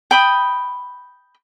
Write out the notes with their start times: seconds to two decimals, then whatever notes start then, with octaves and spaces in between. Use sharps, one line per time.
0.11 G5 B5 D#6